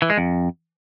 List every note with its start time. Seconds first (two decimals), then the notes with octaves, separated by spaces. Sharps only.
0.02 E3
0.10 G#3
0.18 F2